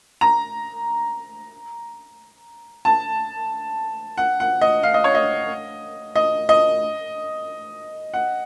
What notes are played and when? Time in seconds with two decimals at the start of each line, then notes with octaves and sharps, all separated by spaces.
0.21 A#5
2.85 A5
4.18 F#5
4.40 F#5
4.61 D#5
4.83 F5
4.94 D#5
5.04 C#5
5.15 D#5
6.16 D#5
6.49 D#5
8.14 F#5